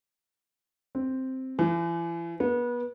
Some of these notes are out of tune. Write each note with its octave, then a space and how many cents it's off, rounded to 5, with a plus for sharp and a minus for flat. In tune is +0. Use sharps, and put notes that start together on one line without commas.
C4 +0
E3 +40
B3 -30